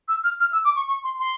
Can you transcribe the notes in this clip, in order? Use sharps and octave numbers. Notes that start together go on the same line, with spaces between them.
E6
F6
F6
E6
D6
C#6
C#6
C6
C6